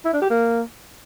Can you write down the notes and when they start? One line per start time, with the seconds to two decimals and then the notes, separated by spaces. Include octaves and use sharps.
0.05 E4
0.13 D4
0.22 G4
0.30 A#3